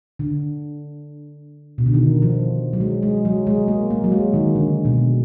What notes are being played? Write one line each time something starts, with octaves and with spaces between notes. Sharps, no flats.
D3
B2
D3
D#3
F3
F#3
G#3
G#3
F#3
G#3
A#3
A#3
F#3
G#3
D#3
D3
B2